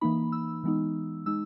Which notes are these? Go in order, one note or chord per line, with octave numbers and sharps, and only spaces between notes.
E3 A#3 D#4 B5
E6
E3 G#3 B3 D#4
G#3 D#4 E6